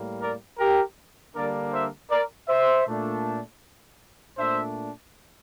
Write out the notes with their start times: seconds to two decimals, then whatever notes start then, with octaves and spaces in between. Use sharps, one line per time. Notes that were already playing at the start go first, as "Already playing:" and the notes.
Already playing: A2 G3 A#3
0.21 A#4 D5
0.58 G4 A#4
1.35 D3 G3 A#3 D4 A#4 D5
1.72 C5 E5
2.10 A#4 D5
2.48 C5 E5
2.87 A#2 A3 D4
4.38 A#2 A3 D4 C5 E5